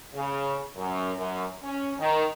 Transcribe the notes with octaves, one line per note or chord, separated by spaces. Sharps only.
C#3
F#2
F#2
C#4
D#3